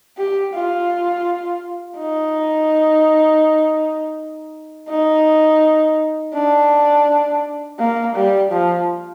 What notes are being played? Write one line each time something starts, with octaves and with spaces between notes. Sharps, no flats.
G4
F4
D#4
D#4
D4
A#3
G3
F3